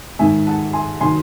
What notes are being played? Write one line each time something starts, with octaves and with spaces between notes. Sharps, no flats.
G#2 D#3 G#3 E5 G#5
F#5 A5
G#5 C6
D#3 F#3 G#5 C6